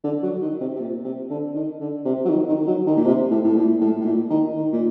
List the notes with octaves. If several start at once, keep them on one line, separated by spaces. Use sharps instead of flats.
D3
F#3
D#3
C3
C3
A#2
C3
D3
D#3
D3
C3
F#3
D#3
D#3
D#3
F#3
D#3
A#2
C3
A2
A2
A#2
A2
A2
A#2
D#3
D#3
A#2